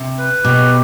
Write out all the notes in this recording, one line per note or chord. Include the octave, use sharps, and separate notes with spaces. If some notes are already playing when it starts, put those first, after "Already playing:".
Already playing: C3
B4
B2 G4